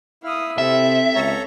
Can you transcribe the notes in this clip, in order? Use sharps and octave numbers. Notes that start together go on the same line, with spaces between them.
E4 F5 D#6
C3 C4 A4 E5
C#2 A4 C#5 A#5